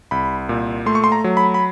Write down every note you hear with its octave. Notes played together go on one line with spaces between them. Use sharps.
C2 B5
A#2
A3 C6
C#6
C6
A#5
F#3
B5
B5